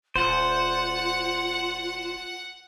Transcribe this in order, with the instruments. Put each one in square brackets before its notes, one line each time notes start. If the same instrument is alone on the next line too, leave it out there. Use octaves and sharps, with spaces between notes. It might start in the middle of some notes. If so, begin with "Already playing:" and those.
[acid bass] D#1 [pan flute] F4 [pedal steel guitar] C5 [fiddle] F#5